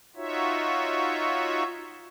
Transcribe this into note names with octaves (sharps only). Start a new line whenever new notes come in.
D#4 F4 F#4 C#5 E5